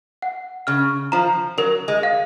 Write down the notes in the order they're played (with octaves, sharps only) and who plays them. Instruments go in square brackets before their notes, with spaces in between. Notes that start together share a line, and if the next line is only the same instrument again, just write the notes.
[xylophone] F#5
[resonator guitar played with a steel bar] C#3 [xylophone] F6
[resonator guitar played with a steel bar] F3 [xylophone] A#5
[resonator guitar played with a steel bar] F#3 [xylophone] A#4
[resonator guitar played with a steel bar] G#3
[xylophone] F5